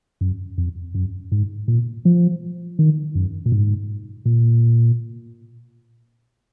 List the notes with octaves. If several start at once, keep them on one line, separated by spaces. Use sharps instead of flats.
F#2
F2
F#2
G#2
A#2
F3
D#3
F#2
A#2
G#2
A#2